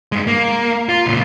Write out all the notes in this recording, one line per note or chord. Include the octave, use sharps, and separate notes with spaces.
G2 G#3
A#3
F4
C#2 A#2